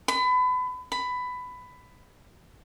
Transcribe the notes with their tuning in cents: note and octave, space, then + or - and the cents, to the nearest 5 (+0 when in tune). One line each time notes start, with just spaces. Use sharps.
B5 +30
B5 +15